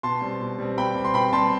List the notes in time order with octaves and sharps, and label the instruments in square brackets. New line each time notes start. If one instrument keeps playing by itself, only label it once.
[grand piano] B2 A5 C6
G3 C4
B2
G3 C4
B2 G5 B5
G3 C4
C6
B2 G5 B5
G3 C4 A5 C6